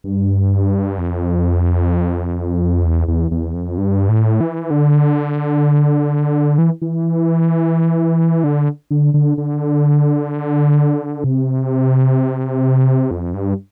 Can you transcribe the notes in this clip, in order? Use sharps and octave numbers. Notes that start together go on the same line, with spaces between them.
G2
F2
E2
E2
E2
F2
G2
A2
E3
D3
E3
E3
D3
D3
D3
D3
C3
F2
G2